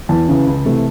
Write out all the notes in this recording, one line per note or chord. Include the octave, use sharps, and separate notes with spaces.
E2 A5
C#3 E3
C#2
C3 E3 A3